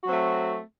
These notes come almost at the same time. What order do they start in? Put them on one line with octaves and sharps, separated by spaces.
F#4 F#3 C4 A3